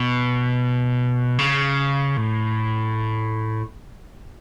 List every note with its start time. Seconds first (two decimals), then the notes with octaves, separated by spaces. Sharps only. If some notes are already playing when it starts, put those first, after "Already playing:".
Already playing: B2
1.39 C#3
2.17 A2